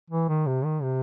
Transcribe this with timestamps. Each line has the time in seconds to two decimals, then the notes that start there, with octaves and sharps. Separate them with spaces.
0.11 E3
0.29 D#3
0.47 C3
0.65 D#3
0.83 C3